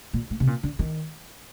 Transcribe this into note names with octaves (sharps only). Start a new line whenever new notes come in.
A#2
A2
C3
A#2
D3
D#3